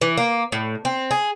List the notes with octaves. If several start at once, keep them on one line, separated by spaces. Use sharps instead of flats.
E3
A#3
A2
C4
G#4